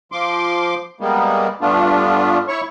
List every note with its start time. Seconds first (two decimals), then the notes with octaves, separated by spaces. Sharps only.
0.12 F3 C6 D6
1.01 G3 G#3 A#3 B3
1.61 G2 A3 B3 D4 F4
2.48 E4 C#5 C#6